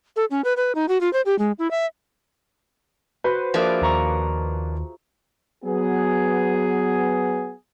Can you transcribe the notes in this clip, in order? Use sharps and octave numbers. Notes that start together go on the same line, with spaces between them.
A4
C#4
B4
B4
D#4
F#4
F4
C5
G4
G#3
E4
E5
F#4 B4 C5
F3 A#3 D4 G#4 E5
D#2 F4 A#5 C#6
F#3 B3 G#4